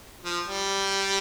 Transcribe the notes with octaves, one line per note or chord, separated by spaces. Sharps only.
F3
G3